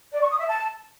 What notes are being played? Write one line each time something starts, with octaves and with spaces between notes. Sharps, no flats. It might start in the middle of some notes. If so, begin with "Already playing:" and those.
D5
C#6
D#6
E5
A5